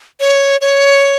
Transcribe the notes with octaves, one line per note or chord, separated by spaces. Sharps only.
C#5
C#5